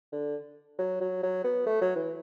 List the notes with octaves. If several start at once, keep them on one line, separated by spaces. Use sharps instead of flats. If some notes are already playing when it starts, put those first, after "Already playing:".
D3
F#3
F#3
F#3
B3
A3
F#3
E3